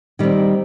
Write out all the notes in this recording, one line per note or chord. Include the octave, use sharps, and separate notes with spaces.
D#3 G3 C4